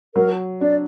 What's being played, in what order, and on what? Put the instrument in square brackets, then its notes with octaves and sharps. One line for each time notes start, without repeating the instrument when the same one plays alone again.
[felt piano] F#3 [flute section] A#4
[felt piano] D4 [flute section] D5